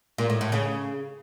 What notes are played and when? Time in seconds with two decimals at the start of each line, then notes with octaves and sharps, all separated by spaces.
0.18 A#2
0.30 A2
0.41 A2
0.52 C#3